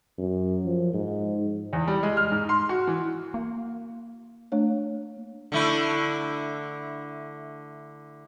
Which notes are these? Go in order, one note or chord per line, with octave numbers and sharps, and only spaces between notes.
F#2
F3
G#2
E2
G3
G#3
F6
G#2
C6
F#4
E3
A#3
A3 D4 C#5
D3 A3 E4